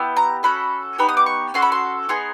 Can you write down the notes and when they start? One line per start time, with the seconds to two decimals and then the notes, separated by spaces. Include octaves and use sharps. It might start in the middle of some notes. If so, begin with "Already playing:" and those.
Already playing: B3 E4 G4
0.17 A#5
0.43 C#4 F#4 A4 B5
0.98 B3 D#4 G4 B5
1.09 D#6
1.17 D6
1.26 C#6
1.54 C#4 F#4 A4 C6
1.62 B5
1.72 C6
2.09 B3 D#4 G#4 C6